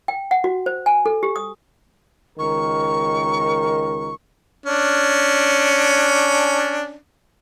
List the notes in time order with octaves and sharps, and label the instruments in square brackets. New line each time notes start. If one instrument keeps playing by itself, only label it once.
[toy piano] G5
F#5
F#4
C5
G#5
A4
G4
D#6
[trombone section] C#2 D#3 A#4 [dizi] C#6
[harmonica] C#4 D4